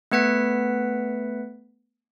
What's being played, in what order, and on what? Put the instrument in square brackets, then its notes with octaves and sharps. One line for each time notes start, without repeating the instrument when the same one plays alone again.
[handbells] A3 B3 B4 F#5 B6